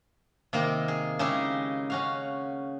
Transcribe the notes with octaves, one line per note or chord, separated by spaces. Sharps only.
C3 D#3 A#3 C4
G#4
C#3 G#3 D#4 E4 G4 G#4
C#4 F#4 F5